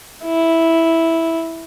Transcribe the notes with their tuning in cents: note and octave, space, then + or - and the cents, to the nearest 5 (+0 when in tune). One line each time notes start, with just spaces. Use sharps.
E4 -5